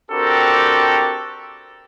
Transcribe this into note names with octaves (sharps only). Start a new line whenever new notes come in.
C4 D4 F#4 G4 A4 A#4